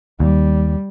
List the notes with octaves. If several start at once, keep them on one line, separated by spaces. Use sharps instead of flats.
D#2 G3